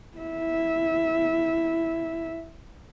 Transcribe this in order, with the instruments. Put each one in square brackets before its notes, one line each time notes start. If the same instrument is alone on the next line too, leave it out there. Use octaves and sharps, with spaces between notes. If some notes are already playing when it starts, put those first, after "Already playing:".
[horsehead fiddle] E4 E5